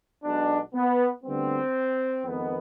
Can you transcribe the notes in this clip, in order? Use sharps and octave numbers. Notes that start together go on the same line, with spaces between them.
B1 B2 G#3 B3 D4
B3
D2 D3 G3 B3 C4
F2 D#3 G#3 B3